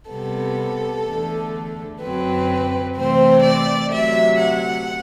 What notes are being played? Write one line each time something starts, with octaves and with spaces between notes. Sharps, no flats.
C3 G3 B3 A4
E2 D3 A3
F#2 D3 F#3 C4 B4
C3 E3 A3 C4 C5
D5
D2 C3 F#3 E5
F#5